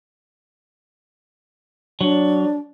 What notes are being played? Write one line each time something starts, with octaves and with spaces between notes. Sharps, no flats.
F#3 D4